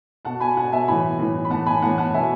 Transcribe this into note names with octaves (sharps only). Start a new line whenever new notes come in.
B2 F#5 A5
G#5 B5
B2 F#5 A5
E5 G#5
A2 E3 G#5 B5
A2 E3
B5
A2 E3 F#5 A5
G#5 B5
A2 E3 F#5 A5
F#5 A5
B2 E5 G#5